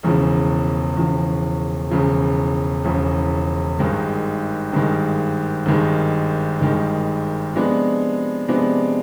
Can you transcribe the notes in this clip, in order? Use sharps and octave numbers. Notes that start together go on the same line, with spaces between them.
E1 E2 C#3 F3
E1 E2 C#3 F3
E1 E2 C#3 F3
E1 E2 C#3 F3
G#1 G2 D#3 G#3
G#1 G2 D#3 G#3
G#1 G2 D#3 G#3
G#1 G2 D#3 G#3
C3 F3 G#3 B3 D4
C3 F3 G#3 B3 D4